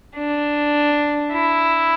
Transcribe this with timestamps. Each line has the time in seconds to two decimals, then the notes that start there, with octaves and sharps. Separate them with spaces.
0.16 D4
1.32 E4